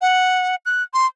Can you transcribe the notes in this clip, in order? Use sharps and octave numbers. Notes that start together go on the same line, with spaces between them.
F#5
F#6
C6